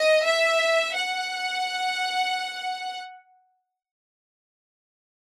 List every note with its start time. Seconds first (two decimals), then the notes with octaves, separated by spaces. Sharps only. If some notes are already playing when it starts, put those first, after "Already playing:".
Already playing: D#5
0.26 E5
0.95 F#5